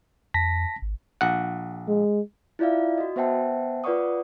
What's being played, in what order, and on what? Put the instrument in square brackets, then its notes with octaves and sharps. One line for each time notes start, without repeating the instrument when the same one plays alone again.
[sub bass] F2 [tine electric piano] A5 A#6 B6
[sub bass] G#1
[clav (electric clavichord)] A#1 F#5
[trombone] G#3
[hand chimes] E4 F4 D5 E5 F5
F#4 D#5
B3 C5 E5 F#5 G5 A5
F4 B4 D5 F#5 C#6 D#6